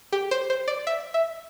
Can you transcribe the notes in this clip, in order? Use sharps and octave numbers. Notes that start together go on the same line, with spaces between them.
G4
C5
C5
D5
E5
E5